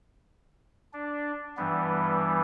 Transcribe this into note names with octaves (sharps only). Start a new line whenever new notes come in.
D4
G2 E3 G3 B3